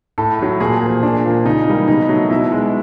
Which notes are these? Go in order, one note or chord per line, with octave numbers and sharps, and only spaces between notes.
A2 A4
F#3 A3
A#2 G#4
F3 A#3
A#2 D4
F3 A#3
C#3 D#4
E3 G3 A#3
B2 D#4
F#3 A3
B2 E4
G#3